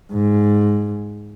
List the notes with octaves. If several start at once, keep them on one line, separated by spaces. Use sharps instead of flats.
G#2